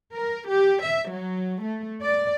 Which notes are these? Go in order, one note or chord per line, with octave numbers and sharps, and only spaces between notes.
A#4
G4
E5
F#3
A3
D5